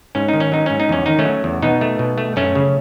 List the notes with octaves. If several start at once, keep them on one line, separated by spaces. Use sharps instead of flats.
G#2 C#4
D#4
D#3
C#4
F#3 D#4
G#2 C#4
D#4
E2 C#4
D#3 D#4
A3 C#4
F#3
E2
B2 B3 D#4
A3
B2
A3
F#2 A3 C#4
C#3